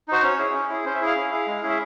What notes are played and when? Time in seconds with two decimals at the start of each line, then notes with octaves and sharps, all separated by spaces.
0.08 D#4 F#4 C5
0.23 C#4 C#5
0.39 E4 G#4
0.54 C#4
0.69 E4 G#4
0.85 C#4 C5
0.95 E5
1.01 E4 G#4 F5
1.16 C#4
1.31 E4 G#4
1.47 G#3
1.63 C#4 E4 G#4
1.70 E5